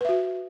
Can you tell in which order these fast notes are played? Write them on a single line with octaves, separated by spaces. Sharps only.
B4 E5 F#4